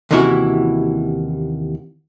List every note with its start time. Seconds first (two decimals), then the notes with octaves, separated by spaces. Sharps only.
0.11 D#2 C3 E3 C#4 E4 F#4